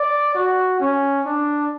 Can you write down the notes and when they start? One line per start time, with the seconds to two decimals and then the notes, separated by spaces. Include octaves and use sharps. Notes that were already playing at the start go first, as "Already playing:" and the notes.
Already playing: D5
0.35 F#4
0.80 C#4
1.25 D4